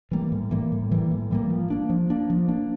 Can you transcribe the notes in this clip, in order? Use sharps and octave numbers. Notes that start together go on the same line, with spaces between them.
E3 G3 A#3
A2
E3 G3 A#3
A2
E3 G3 A#3
A2
E3 G3 A#3
F3
A#3 D4
F3
A#3 D4
F3
A#3 D4